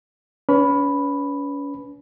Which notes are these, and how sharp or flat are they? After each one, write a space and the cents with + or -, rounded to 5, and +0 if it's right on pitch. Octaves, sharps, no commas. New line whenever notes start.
C#4 +35 B4 +0 B5 +0